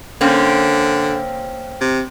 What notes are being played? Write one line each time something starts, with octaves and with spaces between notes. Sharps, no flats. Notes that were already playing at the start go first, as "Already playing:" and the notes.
D3 A#3 C4 C#4
C3